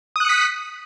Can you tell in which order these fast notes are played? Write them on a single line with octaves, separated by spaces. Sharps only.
D#6 F#6 C#7 B6